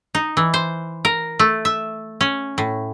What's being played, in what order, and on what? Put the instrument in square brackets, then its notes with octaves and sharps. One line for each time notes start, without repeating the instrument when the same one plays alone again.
[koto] D#4
E3
C5
A#4
A3
E5
C#4
A2